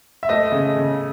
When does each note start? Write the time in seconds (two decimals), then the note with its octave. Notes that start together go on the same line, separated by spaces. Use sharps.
0.23 E5
0.29 A3 D#5
0.52 C#3
0.76 C#3